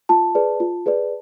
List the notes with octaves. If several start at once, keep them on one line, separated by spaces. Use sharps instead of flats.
F4 A5
G#4 B4 D5
F4
G#4 B4 D5